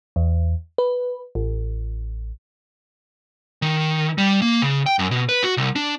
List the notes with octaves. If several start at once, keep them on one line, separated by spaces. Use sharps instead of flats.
E2
B4
A1
D#3
G3
A#3
C#3
G5
F#2
B2
B4
F#4
C2
D4